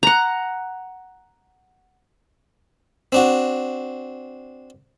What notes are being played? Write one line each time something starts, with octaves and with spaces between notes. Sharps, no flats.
F#5 A#5
C4 D4 F#4